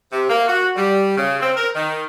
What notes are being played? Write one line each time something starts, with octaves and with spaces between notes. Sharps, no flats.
C3
A#3
F#4
G3
C#3
C4
A#4
D#3